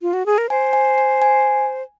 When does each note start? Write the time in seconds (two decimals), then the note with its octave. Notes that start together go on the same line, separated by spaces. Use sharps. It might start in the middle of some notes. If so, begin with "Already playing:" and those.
0.02 F4
0.13 F#4
0.26 G#4
0.38 A#4
0.50 C5 G#5
0.73 G#5
0.98 G#5
1.22 G#5